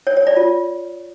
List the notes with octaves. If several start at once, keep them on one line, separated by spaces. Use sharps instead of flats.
C#5
C#5
D5
F4